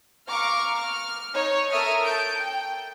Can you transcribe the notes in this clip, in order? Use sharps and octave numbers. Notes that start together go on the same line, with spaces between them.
F5 A#5 C#6 D6 F6
F6
D#4 C#5
A4 A#4 E5 C#6 D#6 F6
A5 G6 D7
G5